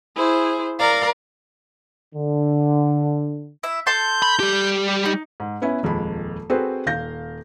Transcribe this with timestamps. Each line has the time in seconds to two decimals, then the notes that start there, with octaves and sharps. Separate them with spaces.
0.16 E4 G#4 C5
0.78 A#4 D5 F5 A#5
2.15 D3
3.63 E4 E5
3.86 A4 A5 C6 G6
4.22 B5
4.40 G3 G4
5.06 D#4
5.40 G#2
5.62 B3 C#4 E4 B4
5.83 D#1 F2 G#3 B5
6.50 C4 F#4 G#4 A4 B4 C5
6.86 D#1 F5 G6 A#6